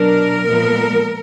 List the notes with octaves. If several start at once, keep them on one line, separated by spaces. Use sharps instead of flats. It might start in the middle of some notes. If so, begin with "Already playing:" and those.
Already playing: B2 F#3 D4 A#4
A#2 F3 G#3 B3